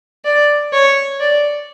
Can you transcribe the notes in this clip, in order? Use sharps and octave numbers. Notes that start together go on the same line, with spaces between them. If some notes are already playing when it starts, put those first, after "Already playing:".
D5
C#5
D5